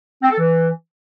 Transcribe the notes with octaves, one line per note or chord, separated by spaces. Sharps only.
C4
A4
E3